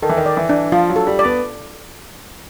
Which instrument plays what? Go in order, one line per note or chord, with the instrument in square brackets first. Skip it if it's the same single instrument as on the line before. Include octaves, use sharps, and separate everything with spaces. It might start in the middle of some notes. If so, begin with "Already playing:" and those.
[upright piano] D#3 [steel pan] A4
[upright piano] E3
D#3
[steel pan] D5
[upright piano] E3
[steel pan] D4
[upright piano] F3 [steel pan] F4
[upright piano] F#3
[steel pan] A4
[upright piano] G3
[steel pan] D5
[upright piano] B3